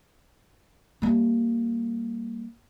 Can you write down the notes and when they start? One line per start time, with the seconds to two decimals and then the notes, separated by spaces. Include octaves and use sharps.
1.02 G3 A#3